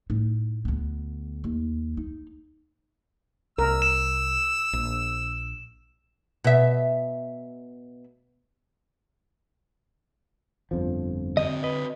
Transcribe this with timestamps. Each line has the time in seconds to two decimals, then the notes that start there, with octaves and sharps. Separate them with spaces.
0.10 A2 D#4
0.65 D2 B3
1.44 D#2
1.97 D#4
3.58 C2 A#4 E6
3.82 E7
4.73 A#1
6.44 B2 E5
10.71 G1 F2 F3
11.37 D3 C4 D#5
11.64 B4 D#5